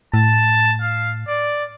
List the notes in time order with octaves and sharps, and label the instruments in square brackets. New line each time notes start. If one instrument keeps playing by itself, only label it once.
[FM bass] A2 [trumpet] A5
[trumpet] F5
D5